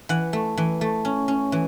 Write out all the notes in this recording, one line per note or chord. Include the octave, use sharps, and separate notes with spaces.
E3 F#5
A3
E3
A3
C#4
C#4
E3